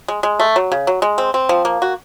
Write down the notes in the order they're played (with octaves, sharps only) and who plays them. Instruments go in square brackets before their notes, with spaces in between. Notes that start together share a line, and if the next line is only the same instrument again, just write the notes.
[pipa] G#3
G#3
A3
F#3
C#3
F#3
G#3
C4
C4
F3
A#3
F#4